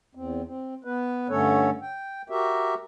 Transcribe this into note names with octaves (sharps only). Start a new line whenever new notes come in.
E2 C4
C4
B3 B4
G2 D3 A3 C#4 A4 C#5
G5
F#4 G4 A#4 E5